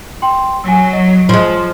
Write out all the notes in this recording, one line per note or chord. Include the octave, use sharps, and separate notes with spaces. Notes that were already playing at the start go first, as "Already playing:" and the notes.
G5 C6
F#3 G#5 E6
D#5
F3 G#3